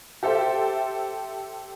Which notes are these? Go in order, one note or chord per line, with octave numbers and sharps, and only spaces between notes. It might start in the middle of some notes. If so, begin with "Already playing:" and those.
G4 A4 C5 E5